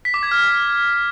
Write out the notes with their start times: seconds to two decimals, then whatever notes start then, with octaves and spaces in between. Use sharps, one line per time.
0.05 B6
0.14 D6
0.23 G#6
0.31 F6